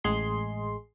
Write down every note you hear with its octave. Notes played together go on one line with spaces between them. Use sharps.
A1 G#3 G#4 C6